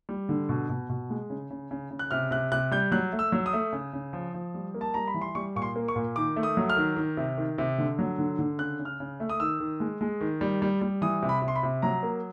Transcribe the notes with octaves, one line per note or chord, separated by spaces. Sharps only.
G3
D3
B2
B2
B2
G#3
C#3
C#3
C#3
C#3
F#6
C3 F6
C3 F#6
C3 F#6
G3 G6
F#3 F#6
A3
E6
F#3
D#6
A3
C#3
C#3
F3
F3
G3
A#3
A5
G3 A#5
B5
E3
C6
G3 C#6
A#2 C#6
C6
A#3
C#6
A#2
D#3 D6
A3
D#6
F#3
F6
D#3
D#3
C3
D#3
C3
D3
F#3
D3
D3
C#3 F#6
C#3
F6
C#3
A3
D#6
D#3 E6
D#3
G#3
G#3
D#3
G3
G3
G3
E3 D#6
C3
B5
C3
C6
B5
C3
F#3 A#5
A#3